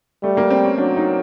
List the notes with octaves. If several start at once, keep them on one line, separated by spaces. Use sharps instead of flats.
G3 A3
A#3
C4
C#4
F#3 D4
D#4